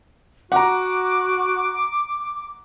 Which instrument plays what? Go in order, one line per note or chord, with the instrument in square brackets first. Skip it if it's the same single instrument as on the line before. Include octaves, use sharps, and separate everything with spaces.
[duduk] F#4 [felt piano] F#5 A#5 [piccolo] D6